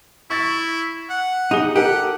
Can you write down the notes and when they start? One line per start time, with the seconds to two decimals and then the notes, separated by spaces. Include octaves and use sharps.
0.30 E4 C#6 A6
1.10 F#5
1.51 D#4 G4 G#4 G7
1.76 G4 A4 A#4 F#5